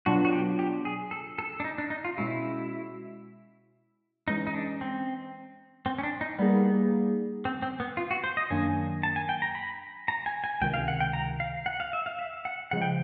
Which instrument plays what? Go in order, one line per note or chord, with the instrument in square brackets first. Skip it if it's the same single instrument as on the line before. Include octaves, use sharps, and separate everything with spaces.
[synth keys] B2 F#3 B3 D4 F4 [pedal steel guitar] F#4
[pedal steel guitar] F#4
G4
G4
G#4
A4
A4
D4
D#4
D4
D#4
F4
[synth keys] B2 G#3 C#4 F#4 [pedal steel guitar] E4
[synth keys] E3 G#3 C#4 [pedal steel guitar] D#4
[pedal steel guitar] D#4
D4
C4
C4
C#4
D4
D#4
[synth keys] G3 A#3 D#4 G#4 [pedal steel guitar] B3
[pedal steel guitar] C4
C4
B3
F4
F#4
C5
D#5
[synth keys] F#2 D#3 F#3 A#3 D4 [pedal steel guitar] G#5
[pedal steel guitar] A5
G#5
G5
A#5
B5
A#5
G#5
G#5
[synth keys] C#2 C3 D#3 [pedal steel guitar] G5
[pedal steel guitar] F5
F#5
G5
A#5
F5
F#5
F5
E5
F5
E5
F#5
[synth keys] C#3 F3 G#3 [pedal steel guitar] F#5
[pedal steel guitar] G5